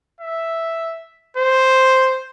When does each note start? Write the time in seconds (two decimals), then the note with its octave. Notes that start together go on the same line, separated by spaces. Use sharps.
0.20 E5
1.37 C5